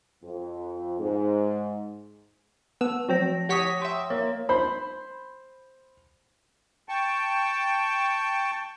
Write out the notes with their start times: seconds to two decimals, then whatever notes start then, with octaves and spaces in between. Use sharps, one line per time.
0.24 F2
0.99 G#2
2.81 B3 A5 E6
3.09 F3 F#3 C4 A5 A#6
3.49 G4 C#5 F#5 C#6 D#6 B6
3.82 E5 G5 C6
4.10 A#3 C#5
4.49 C5 B5
6.89 G5 A5 C#6